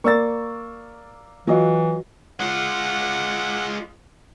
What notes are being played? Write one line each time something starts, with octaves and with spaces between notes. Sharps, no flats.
A#3 D5 C#6 E6 A6
E3 F#3 F4 F#4 D#5
G#3 F4 F#5